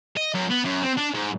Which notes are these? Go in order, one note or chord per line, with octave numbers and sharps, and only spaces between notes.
D#5
F#2
B3
F#2
C4
D4
G#2